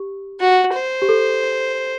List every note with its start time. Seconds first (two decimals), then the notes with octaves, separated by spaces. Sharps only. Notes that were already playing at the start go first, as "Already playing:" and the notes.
Already playing: G4
0.40 F#4
0.74 C5
1.02 G4
1.09 A4